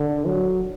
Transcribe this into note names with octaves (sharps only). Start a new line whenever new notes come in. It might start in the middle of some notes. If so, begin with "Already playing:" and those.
Already playing: D3
F#3